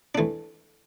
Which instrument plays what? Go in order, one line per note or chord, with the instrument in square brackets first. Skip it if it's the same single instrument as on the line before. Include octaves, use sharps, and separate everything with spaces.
[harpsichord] E3 A3 D4